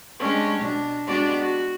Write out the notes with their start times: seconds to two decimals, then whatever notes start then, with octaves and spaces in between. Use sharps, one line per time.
0.21 G#3 C#4 D4 G4
0.60 B2 D4
1.07 G#3 B3 D4 F#4 G4 D5
1.40 F#4